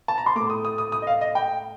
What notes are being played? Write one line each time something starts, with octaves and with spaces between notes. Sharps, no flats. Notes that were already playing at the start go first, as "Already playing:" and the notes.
A5
A#5
C6
A2 A3 D6
D#6
D#6
D#6
D#6
D#5
F5
D#5
G5